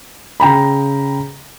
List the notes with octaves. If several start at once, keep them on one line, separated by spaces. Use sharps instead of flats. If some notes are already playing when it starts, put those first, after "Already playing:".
C#3 G5 A#5 B5